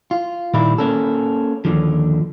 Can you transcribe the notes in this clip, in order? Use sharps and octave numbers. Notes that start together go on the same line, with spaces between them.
F4
A#2 D#3 G3 A#3 E4
A#3 C#4 A4
D#2 G#2 D3 F3